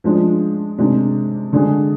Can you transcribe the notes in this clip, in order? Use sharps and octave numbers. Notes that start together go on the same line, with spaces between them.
F3 G#3 D4
C3 D#3 G#3 D4
D3 G#3 D4 G#4